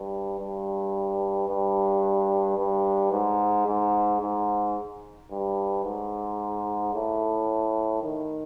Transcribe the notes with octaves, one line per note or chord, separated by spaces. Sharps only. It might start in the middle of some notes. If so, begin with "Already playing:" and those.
Already playing: G2
G2
G2
G2
G#2
G#2
G#2
G2
G#2
A2
D#3